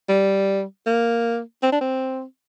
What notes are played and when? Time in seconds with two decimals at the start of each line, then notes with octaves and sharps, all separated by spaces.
0.09 G3
0.86 A#3
1.63 C4
1.72 D4
1.81 C4